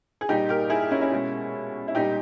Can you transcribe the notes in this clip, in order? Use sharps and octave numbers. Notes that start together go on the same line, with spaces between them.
G#4
A#2 G3 D#4 G4
G4 A#4
E4 G#4
C#4 E4
C#4 E4
B2 G#3
E4
A#2 G3 D#4 G4